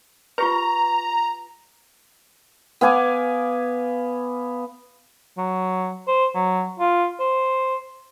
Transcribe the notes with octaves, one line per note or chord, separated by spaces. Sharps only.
F4 G4 B4 A#5
B3 F5 G#5 D6
F#3
C5
F#3
F4
C5